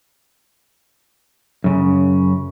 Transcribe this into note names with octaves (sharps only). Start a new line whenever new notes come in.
F#2 C#3